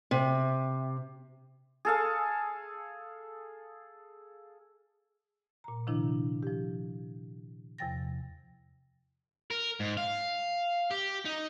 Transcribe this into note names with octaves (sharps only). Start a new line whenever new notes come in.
C3
G#4 A4 F5
A#2 A#5
C3 D#3 F3 D4 E4
F3 G4
E2 C3 F3 G5 A6 A#6
A#4
G#2
F5
G4
D#4